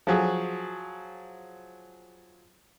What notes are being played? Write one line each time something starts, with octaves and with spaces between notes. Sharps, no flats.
F3 F#3 G#4